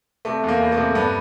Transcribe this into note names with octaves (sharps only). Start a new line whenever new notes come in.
C3 A3
E2
A#3
E2
A3
C3
G2 B3